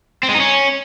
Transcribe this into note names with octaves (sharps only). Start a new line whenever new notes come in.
C4
G#3
D#4
C#4